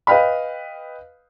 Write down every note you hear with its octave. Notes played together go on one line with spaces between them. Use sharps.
B4 D#5 F5 G5 B5